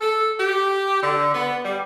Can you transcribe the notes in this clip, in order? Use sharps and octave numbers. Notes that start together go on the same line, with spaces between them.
A4
G4
D3
B3
G3